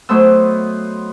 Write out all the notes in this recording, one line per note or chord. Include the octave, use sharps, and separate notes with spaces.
F#3 A3 B3 C5 D#5 E6